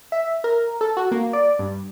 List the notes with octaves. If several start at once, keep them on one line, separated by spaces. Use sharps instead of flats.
E5
A#4
A4
F#4
A#3
D5
G2